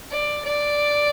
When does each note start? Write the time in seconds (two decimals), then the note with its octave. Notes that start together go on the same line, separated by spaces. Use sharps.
0.11 D5
0.45 D5